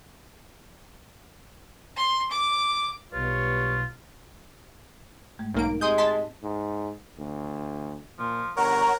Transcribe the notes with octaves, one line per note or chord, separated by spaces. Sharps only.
C6
D6
B1 B2 G3 F4 B4 C#5
G#2 G#3 A3
B1 A#3 D#4 D7
G#3 C4 G4 C6 D#6 G6
D#5 A5 C6 B6
G#2
D2
A#2 F3
G1 A#4 C#5 F#5 A#5